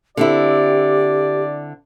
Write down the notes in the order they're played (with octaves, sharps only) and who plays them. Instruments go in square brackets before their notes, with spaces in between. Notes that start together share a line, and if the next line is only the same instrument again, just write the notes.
[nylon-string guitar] D3 C4 E4 [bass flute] G4 [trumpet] D5